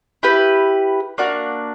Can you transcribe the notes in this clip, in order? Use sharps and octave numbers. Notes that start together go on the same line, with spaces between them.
E4 G4 B4
A#3 D4 F#4